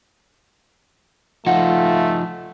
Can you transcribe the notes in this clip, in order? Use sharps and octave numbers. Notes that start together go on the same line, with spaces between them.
F3 A3 D#4 F4 F#5